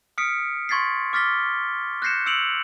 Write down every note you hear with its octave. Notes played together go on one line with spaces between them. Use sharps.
D#6 F6 B6 C#7 D7
C6 C#6 G#6 A6 B6 C7
D6 F6 A6 B6 G7
F#6 G6 A#6 C7 C#7 E7
E6 C#7 D7 F7 F#7